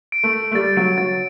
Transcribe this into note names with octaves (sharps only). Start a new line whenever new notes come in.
D7
A3
D7
A3
G3 A6
F#3 D7
F#3 A6